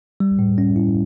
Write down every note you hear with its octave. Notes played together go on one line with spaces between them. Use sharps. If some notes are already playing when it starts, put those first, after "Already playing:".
G3
A2
C#4
E4